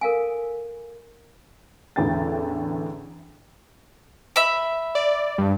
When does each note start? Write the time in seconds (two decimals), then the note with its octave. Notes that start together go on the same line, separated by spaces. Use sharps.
0.01 A4 A#4 F5 G#5
1.96 A1 E2 D3 A3 G5 A6
4.36 E5 B5
4.95 D5
5.38 G2